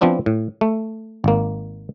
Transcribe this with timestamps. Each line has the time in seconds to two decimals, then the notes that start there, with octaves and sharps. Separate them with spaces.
0.01 F3 B3 C4 D4 E4
0.26 A2
0.61 A3
1.24 G#1 A#3